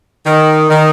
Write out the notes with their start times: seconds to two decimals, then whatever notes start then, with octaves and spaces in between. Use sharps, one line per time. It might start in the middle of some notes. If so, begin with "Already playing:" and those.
0.24 D#3
0.69 D#3